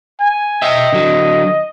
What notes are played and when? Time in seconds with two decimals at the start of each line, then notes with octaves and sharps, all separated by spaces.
0.19 G#5
0.62 D#5 E5 G5
0.93 D3 F#3